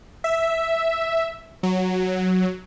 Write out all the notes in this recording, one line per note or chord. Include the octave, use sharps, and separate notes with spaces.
E5
F#3